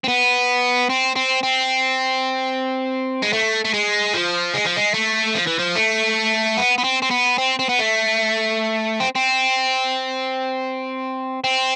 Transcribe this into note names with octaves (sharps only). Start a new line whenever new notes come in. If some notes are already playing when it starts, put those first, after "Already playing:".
C4
B3
C4
C4
C4
G#3
A3
A3
G#3
F3
G#3
F3
G#3
A3
F3
E3
F3
A3
B3
B3
C4
C4
B3
C4
C4
B3
A3
C4
C4
C4